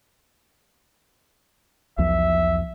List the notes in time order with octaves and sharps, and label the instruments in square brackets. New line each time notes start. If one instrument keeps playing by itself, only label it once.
[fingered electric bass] B1 E2 F3 [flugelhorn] E5